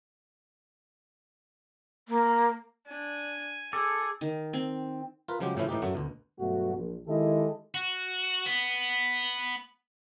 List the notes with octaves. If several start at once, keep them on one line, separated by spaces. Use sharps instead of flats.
A#3
D4 G#5
G#4 A4 D6 E6
D#3
C4
F4 A#4 B4
C#3 F3 F#3 G#3 G4
A2 C#3 E3 F3 C#4 E4
A2 E3 D#4 G4
F#2 F#3 A3
D2 B2
G2 B2 F#3 A3 F#4
A#1
D#3 G#3 E4 G4 A4 D#5
F#4
B3